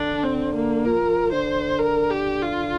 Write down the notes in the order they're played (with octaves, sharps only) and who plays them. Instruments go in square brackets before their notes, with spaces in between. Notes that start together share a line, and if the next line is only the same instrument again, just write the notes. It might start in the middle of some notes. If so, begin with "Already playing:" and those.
Already playing: [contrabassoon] D3 [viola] D4
[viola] C4
A#3
[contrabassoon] F3 [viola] A#4
[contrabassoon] D3 [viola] C5
[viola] A#4
G4
F4